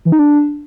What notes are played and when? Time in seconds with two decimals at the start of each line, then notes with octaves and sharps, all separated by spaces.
0.05 E3
0.12 D#4
0.19 D4